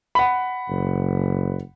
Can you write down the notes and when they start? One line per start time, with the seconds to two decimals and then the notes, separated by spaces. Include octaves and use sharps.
0.15 F#5 B5
0.69 F#1